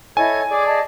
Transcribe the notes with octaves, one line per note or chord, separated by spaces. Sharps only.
E4 A4 C#5 D#5 G#5 G#6
G#4 D5 D6
D#5 A5